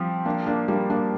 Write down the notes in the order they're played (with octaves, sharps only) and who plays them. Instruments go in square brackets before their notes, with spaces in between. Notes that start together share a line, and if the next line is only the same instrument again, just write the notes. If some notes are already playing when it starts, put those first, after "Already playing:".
Already playing: [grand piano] F3 G4 [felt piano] G3 C4
[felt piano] A#3 D4
A#3 D4
G3 A#3
A#3 D4